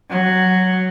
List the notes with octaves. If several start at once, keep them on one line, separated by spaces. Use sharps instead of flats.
F#3